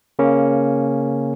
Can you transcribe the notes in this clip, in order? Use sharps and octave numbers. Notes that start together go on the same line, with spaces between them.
C#3 A#3 C#4